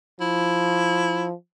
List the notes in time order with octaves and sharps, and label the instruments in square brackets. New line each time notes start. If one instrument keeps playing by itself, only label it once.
[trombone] F3 [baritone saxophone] E4